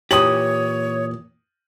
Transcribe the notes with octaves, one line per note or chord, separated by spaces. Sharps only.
A#2 E3 G4 C#5 D#6 F#7